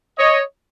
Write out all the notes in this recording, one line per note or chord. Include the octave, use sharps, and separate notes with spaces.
C#5 D#5